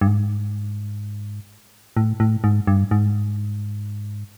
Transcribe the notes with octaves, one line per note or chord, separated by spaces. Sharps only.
G2
G#2
A2
A2
G#2
G2
G#2